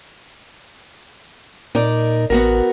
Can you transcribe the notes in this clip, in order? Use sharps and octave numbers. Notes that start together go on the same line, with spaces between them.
A#2 D#4 A#4 D5
A1 B3 F#4 A#4